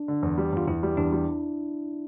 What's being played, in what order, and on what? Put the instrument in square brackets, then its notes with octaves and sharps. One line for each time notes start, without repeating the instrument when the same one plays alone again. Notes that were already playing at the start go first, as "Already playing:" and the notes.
Already playing: [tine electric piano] D4
[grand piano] D3
E2
G3
[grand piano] E2 [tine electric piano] F4
[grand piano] E2 [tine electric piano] E4
[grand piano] G3
[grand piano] E2 [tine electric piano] D4
[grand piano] G3